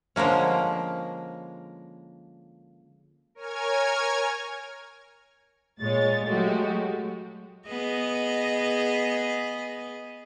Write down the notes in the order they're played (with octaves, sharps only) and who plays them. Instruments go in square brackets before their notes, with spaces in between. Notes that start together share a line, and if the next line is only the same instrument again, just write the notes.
[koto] D3 F3 G#3 A#3 C#4
[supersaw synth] A#4 C#5 G#5 F6 G#6
[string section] A#2 G#3 C#5 A6
F#3 G#3 A3 F#4 G4
[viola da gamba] B3 G#4 D#5